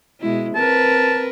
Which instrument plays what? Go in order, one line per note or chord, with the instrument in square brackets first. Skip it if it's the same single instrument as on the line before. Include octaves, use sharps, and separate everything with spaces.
[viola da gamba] B2 G#3 E4
[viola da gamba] C4 A#4 B4 [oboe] A5